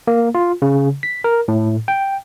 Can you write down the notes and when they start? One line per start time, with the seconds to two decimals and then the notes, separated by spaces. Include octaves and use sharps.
0.07 A#3
0.35 F4
0.62 C#3
1.03 B6
1.24 A#4
1.48 A2
1.88 G5